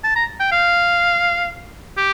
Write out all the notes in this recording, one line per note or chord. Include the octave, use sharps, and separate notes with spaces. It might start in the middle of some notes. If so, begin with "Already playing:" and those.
A5
A#5
G5
F5
G4